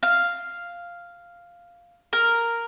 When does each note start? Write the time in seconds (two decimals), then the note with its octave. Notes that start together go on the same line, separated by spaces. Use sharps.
0.03 F5
2.13 A#4